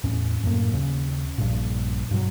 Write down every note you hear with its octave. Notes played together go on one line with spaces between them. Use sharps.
E2 A2 C#4
F#2 A2 A#3
D#2 C#3 C#4
A#1 G2 A#2
G2 B2 F#3